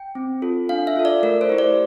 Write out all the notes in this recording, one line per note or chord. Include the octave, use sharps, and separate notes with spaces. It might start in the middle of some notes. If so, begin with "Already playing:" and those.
Already playing: G5
C4
F4 A4
D4 F5
E5
F4 A4
D5
A3 A#4
C5
E4 G4
D5